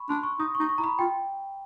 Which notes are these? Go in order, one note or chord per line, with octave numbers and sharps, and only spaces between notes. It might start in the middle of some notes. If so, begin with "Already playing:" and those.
Already playing: B5 C#6
D4 C6
C#6
D#4 D#6
D#4 C#6
C#6
E4 A#5
B5
F4 G5